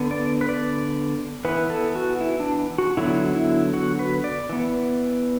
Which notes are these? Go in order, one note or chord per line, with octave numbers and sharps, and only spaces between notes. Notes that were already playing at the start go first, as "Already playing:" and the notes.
Already playing: D3 B3
D5
B4
D5
E3 B3 B4
A4
F#4
E4
D4
F#4
D3 F#3 B3 E4
E4
F#4
B4
D5
E3 B3